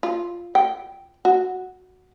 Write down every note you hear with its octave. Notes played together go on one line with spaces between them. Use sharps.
F4
G5
F#4